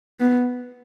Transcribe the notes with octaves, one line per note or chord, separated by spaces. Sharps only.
B3